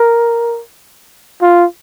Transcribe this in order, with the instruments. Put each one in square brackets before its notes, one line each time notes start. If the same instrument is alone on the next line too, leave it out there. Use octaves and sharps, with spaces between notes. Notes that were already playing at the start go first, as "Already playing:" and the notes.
Already playing: [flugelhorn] A#4
F4